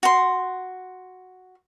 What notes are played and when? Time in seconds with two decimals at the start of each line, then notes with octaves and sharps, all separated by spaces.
0.03 F#4 C6